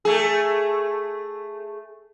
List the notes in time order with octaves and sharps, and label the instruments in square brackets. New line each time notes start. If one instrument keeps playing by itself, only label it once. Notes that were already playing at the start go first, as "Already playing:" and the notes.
[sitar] A3 G#4